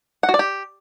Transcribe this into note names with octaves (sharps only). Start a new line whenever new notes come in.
F#5
F#4
D5
G4